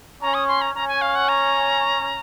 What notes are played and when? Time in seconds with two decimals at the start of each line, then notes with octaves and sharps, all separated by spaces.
0.22 C#4 A#5
0.34 D#6
0.48 C6
0.61 A#5
0.75 C#4 A#5
0.88 G#5
1.02 F5
1.15 F#5
1.29 A#5